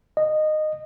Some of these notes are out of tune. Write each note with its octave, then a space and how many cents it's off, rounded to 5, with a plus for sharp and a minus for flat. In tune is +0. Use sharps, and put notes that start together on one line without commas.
D#5 -15